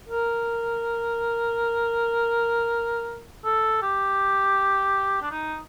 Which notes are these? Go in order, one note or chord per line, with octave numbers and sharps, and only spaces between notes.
A#4
A4
G4
D4
D#4